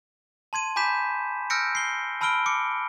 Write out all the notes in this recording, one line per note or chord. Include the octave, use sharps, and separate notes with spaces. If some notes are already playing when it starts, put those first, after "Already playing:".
A5 C6 G#6 D#7
G#5 B5 D6 G6 B6 E7
E6 F6 G6 A#6 C#7 D7
C7 G7
A5 B5 E6 F6 D7 G7
D6 C#7